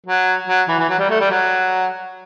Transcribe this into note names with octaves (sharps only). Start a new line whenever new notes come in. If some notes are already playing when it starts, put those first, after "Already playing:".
F#3
F#3
E3
E3
F#3
G3
A3
G3
F#3